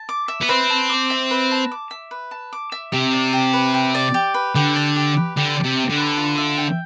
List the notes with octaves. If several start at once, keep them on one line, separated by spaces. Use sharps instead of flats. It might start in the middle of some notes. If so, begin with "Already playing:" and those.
Already playing: A5
D6
E5
B3
C4 B4
A5
D6
E5
B4
A5
D6
E5
B4
A5
D6
E5
C3 G4
D5
G4
B4
G4
D5
G4
B4
D3 G4
D5
G4
B4
D3 G4
D5
C3
G4
D3
B4
F4
E5
G5